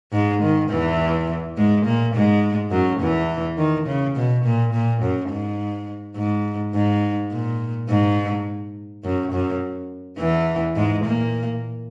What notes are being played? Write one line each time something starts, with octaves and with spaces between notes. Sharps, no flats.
G#2 G#3
D#3
E2 E3
G#2 G#3
A#2 A#3
G#2 G#3
F#2 F#3
E2 E3
D#3
C#3
B2
A#2
A#2
F#2
G#2
G#2
G#2
A#2
G#2
F#2
F#2
E2 E3
G#2 G#3
A#2 A#3